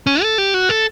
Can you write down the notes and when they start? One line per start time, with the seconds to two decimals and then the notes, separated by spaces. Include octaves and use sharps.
0.07 C#4
0.22 A4
0.38 G4
0.54 F#4
0.69 A4